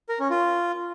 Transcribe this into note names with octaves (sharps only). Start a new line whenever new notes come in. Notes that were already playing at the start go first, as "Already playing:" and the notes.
A#4
C#4
F4